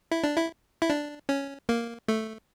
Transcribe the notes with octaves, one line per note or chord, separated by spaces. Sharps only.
E4
D4
E4
E4
D4
C#4
A#3
A3